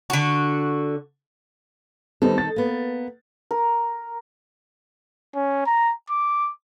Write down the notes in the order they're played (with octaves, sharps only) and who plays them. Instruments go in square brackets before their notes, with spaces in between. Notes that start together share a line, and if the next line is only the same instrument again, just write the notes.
[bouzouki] D3 F#4
[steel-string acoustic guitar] D#3 D#4 A4 [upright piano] G3 B3 C4
[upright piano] A6
[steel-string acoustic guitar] A#3 B3
[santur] A#4
[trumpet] C#4
A#5
D6